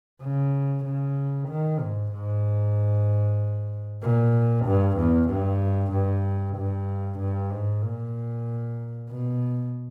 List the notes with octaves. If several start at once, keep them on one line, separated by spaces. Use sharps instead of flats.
C#3
C#3
D#3
G#2
G#2
A#2
G2
E2
G2
G2
G2
G2
G#2
A#2
B2